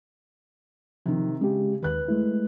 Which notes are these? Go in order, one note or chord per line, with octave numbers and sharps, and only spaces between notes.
C3 D#3 F3
C#3 G#3 G4
D#2 D#3 B4 F#6
G#3 A3 E4